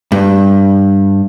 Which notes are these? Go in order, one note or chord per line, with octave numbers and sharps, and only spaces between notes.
G2